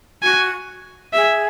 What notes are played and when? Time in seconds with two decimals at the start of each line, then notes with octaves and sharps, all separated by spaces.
0.23 F#4 G#5
1.13 G#4 E5